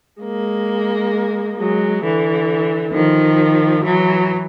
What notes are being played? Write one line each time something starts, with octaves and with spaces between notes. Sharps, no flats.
G#3 A#3
F#3 G#3
D3 E3
D#3 F3
E3 F#3